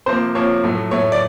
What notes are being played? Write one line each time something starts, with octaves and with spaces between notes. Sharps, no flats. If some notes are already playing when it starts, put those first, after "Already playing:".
C3 F3 A#3 C5
C3 F3 A#3 C#5
A2 F#3 A3
A2 F#3 A3 C#5
D5